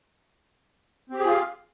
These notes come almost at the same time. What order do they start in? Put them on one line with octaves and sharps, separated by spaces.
C4 G4 G#4 F4 F5